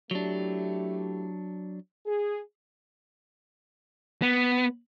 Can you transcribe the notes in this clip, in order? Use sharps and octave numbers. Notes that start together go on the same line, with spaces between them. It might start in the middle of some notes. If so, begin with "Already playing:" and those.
F#3 A3 D4 E4 G4
G#4
B3